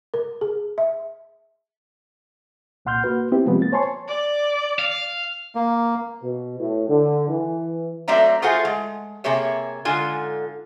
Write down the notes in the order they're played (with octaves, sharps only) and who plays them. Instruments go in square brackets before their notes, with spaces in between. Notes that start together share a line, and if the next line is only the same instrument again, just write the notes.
[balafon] A#4
G#4
E5
[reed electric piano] C2 A#2 F#5 C6 F6 G6
A#3 F#4 B4
B3 C4 E4 G4
C3 F3 G3 G#3 B3 C4
A#3 A6
C5 C#5 G#5 A5 C6 C#6
[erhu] D5
[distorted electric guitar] F5
[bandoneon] A#3
[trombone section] B2
A2
D3
E3
[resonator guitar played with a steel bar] F#3 A3 C4 D5 E5 A#5
A3 F4 F#4 G#4 C5 F#5
G#3
C3 A#3 G#4 C#5 E5
G#2 D3 F4 G#5